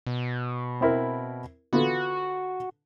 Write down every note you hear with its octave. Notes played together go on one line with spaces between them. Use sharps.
B2
C4 E4 A#4
D3 B3 F4 F#4